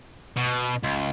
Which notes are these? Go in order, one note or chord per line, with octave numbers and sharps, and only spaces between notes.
B2
C#2